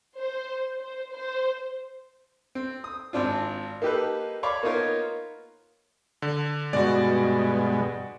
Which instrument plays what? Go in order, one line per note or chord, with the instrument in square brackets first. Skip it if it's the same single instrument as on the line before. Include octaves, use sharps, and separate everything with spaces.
[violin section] C5
C5
C5
[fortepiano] C4
D#6
G#1 C4 D4 F4
A#3 D#4 G4 A4 B4
C#5 D5 F5 B5 C#6 D6
A#3 B3 D#4 F4 A#4 C#5
[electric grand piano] D3
[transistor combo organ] G2 B2 G#3 [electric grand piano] F#4 D5